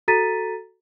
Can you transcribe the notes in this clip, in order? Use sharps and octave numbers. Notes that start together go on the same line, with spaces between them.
F#4 A4 A#5 A6 B6 D#7